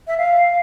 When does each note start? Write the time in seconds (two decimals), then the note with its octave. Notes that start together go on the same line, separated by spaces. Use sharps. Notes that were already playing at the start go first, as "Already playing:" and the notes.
0.07 E5
0.17 F5